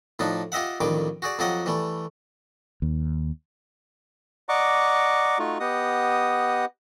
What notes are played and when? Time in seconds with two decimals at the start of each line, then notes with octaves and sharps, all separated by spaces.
0.19 A2 F3 D4 D#4
0.52 F4 G4 D#5 E5 F#5
0.81 A1 F2 D#3 G3 D6
1.22 F#4 G#4 D5
1.39 F2 F#3 F4 G4 D#5 F#5
1.66 E3 G3 A3
2.82 D#2
4.49 D5 D#5 F#5 A#5 C#6 D6
5.39 A3 D#4 F4 F#4
5.60 B3 G4 D#5 F#5 D#6